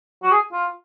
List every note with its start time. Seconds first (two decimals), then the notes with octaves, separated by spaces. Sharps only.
0.23 F#4
0.31 G#4
0.52 F4